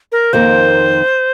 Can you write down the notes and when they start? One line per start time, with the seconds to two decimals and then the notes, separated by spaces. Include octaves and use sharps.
0.12 A#4
0.33 F2 D#3 A#3 D#4 A#4 C5